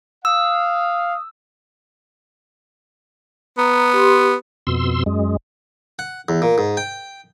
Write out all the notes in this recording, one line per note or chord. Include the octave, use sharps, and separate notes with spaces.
F5 D#6 E6
B3 A#5
G4 C6
F2 B2 C6 E6
F#2 G#3
F#5
E2
A#2
G#2
G5